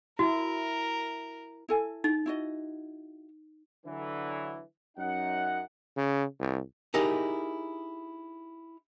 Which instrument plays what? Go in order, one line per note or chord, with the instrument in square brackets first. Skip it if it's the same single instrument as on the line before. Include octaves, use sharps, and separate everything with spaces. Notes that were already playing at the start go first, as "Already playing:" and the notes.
[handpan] E4 [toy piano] F#4 [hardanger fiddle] A#4
[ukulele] E4 A4 G#5
[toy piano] D#4
[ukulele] E4 F#4 D#5
[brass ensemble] D3 E3 F#3
F#2 D#4 F#5
[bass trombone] C#3
C2
[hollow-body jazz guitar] D#4 E4 G4 G#4 A#4 D#5